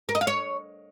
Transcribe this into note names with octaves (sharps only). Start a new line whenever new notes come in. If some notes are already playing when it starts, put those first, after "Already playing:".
A#4
D#5
F5
C#5